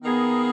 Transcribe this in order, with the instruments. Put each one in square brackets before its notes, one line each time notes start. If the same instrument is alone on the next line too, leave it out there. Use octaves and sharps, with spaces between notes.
[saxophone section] D#3 A#3 D#4 G#4 [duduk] B3